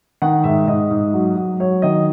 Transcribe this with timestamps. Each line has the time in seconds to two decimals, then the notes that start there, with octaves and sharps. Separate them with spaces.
0.22 D#3 F#5
0.44 G#2 E5
0.67 G#2 D#5
0.91 G#2
1.14 F#3
1.36 F#3
1.60 F#3 C#5
1.82 D#3 D#5